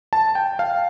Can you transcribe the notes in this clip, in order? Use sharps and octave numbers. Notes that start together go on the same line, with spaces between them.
A5
G5
F5